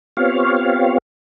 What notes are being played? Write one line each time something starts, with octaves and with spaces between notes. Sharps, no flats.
B3 C4 F4 G4 C#5 F5